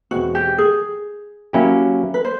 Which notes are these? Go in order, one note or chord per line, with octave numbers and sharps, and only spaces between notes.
E2 B2 G#3 C4 F#4
G4
G#4
F#3 A#3 C#4 E4 G4
B4
C5